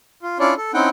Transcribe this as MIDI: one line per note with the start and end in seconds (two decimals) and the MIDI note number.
0.23 0.38 65
0.39 0.54 61
0.39 0.54 62
0.39 0.54 64
0.39 0.54 65
0.39 0.54 73
0.39 0.54 74
0.57 0.72 69
0.74 0.89 60
0.74 0.89 61
0.74 0.89 63
0.74 0.89 64
0.74 0.89 78
0.74 0.89 79